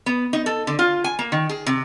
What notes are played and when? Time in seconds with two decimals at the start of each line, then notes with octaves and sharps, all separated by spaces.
0.06 B3
0.33 D#4
0.46 A4
0.67 D3
0.79 F4
1.04 G#5
1.19 A#3
1.32 D#3
1.49 G#4
1.66 C3